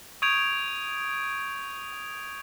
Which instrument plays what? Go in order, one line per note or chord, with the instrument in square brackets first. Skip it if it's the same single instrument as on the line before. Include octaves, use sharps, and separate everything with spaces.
[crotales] C#6 D#6 G6 G#6 D7 F7